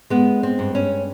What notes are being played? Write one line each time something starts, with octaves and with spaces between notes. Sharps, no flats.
G#3 B3
C4
G2
C#4